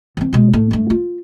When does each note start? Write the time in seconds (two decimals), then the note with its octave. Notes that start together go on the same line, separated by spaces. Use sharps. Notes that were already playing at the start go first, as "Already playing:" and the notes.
0.17 E3 C4
0.33 B2 G#3
0.53 A2 A3
0.71 G2 A3
0.90 F4